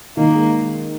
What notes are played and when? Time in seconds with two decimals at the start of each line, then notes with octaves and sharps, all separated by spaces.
0.17 D#3 A#3
0.35 G#3